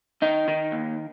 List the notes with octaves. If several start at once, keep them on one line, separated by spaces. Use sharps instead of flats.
D#3 D#4
D#3
D#2